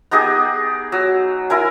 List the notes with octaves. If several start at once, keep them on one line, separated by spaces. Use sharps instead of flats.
B3 D#4 G4 G#4
F#3
E4 A#4 G#5